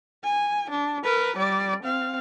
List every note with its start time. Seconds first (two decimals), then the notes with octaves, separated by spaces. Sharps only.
0.24 G#5
0.70 D4
1.04 A#4 B4
1.36 G3 D5
1.83 C4 F5